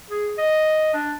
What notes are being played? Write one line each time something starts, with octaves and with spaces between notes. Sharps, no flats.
G#4
D#5
D4